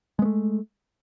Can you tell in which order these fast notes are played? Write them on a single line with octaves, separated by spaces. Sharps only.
G#3 B3 A3